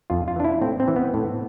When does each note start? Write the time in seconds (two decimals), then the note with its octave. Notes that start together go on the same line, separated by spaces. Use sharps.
0.10 F2 F4
0.28 F4
0.36 E3 D4
0.44 E4
0.61 A2 C4
0.80 C4
0.88 E3
0.96 B3
1.14 A2